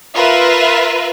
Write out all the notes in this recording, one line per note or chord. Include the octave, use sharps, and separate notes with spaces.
F4 A#4 B4 E5